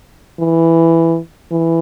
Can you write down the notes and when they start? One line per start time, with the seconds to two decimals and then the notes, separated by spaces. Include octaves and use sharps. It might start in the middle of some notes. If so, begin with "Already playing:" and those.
0.39 E3
1.51 E3